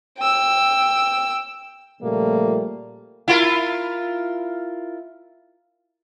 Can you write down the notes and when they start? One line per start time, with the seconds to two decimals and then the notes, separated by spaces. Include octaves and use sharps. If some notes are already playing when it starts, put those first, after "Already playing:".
0.19 G5 E6
2.02 A#2 C#3 F3 G3 A3 A#3
3.28 E4 F4 A#4